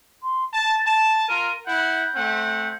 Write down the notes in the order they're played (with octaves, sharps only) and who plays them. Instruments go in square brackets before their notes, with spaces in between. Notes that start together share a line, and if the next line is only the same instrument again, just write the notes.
[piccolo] C6
[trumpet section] A5 [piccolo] A6
[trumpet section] A5 [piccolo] E7
[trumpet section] F4 A#4 [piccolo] D#7
[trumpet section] E4 F#5 [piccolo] G6
[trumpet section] A3 C4 F#5